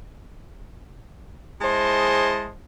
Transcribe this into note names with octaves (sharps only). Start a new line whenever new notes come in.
G#3 E4 G#4 C5 D#5 A5